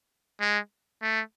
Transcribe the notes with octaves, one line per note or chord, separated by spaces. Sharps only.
G#3
A3